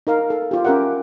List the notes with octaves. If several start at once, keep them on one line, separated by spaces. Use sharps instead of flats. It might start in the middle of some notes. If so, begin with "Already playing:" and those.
D#4 A#4 F5
A4
F4 G4
C#4 G4 A#4 E5 F#5